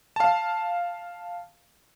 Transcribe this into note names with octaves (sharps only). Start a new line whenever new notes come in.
F5 A5